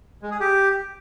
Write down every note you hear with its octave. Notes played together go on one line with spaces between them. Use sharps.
G#3
G#4
G4